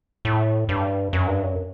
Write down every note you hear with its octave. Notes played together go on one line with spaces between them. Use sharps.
A2
G2
F#2
G2
F#2